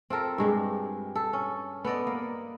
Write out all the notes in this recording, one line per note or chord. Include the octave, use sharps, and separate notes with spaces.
C4 F4 A4 A#4
G2 G#3 G4
A4
C#4
B3 A4 D5 D#5
A#3